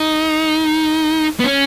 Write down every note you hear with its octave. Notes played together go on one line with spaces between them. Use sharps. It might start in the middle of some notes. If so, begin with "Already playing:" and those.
Already playing: D#4
B3
C#4